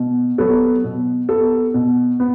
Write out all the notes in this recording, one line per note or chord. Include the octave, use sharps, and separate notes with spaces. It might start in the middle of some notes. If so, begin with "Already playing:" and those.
Already playing: B2
F#3 B3 A4
B2
B3 A4
B2
B3